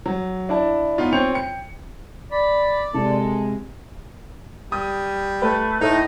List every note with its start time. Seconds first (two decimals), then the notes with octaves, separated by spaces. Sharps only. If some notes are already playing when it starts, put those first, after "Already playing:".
0.06 F#3
0.49 D4 E4 A5
0.98 B3 D#4 F4 C#5
1.12 C4 F4 C#5 G5 C#7 F7
1.31 G5 C#7
2.32 D5 B5
2.94 C3 G#3 A4
4.72 G3 D#6
5.42 A3 B4
5.81 A2 D#4 D#5